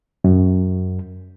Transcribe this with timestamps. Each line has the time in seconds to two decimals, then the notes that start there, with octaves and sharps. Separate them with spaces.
0.24 F#2